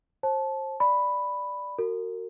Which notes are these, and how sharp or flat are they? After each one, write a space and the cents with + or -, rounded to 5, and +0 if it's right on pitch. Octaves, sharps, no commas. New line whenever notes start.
C5 +35 A5 -20
D5 +0 B5 +0
F#4 +0 A#4 -35